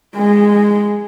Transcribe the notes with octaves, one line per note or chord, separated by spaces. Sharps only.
G#3